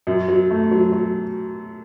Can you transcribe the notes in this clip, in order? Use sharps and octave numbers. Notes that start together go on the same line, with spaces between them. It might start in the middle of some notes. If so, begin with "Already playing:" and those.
F#2
F#3
A3
F#3
F#3